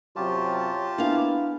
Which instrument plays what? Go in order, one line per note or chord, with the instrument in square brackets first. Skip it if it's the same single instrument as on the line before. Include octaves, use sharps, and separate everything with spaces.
[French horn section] F#2 C3 F#3 [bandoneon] F4 G4 A5 [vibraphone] C#6
[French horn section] A#3 B3 E4 [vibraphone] D4 [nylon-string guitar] G#4 F5